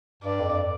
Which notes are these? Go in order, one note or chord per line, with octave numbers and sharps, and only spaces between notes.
G2 D5
F2